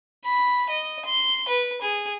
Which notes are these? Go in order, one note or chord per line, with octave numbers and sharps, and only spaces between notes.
B5
D#5
C6
B4
G#4